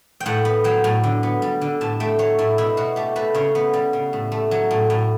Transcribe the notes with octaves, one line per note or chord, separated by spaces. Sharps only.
G5
A2 F#5
B3
F#3 G5
A2
D3
B3
G3
D3
A2 A5
A3 G5
F#3 C#5
A2 E4
B2 E4
B2 F#4
A3 G4
A3 B4
C#3 C#5
B3
G3
C#3
A2
A3
F#3
A2
A2